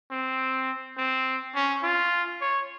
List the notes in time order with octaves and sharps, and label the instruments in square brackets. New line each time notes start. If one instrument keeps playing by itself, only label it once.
[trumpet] C4
C4
C#4
F4
C#5